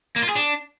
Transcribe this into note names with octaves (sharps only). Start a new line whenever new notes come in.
A#3
F4
G#4
D4